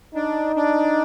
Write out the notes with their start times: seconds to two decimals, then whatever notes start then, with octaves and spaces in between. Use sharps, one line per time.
0.14 D4 D#4
0.56 D4